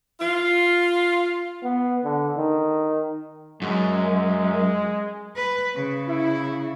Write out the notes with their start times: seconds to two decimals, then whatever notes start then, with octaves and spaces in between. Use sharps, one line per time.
0.20 F4
1.63 B3
2.04 D3
2.37 D#3
3.62 F#2 G#3
5.36 B4
5.76 C#3
6.09 E4